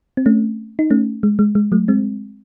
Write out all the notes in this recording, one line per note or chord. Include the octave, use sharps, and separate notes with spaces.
C4
A3 C#4
D#4
A3 C#4
G#3
G#3
G#3
F#3 A3
G#3 C4